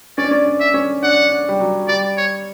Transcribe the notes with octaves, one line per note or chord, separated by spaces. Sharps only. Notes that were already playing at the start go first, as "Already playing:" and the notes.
C#4 D5
D4
C#4
D4
E5
C#4
D4 F#5
D4
G3
F#3
G3 D5
C#5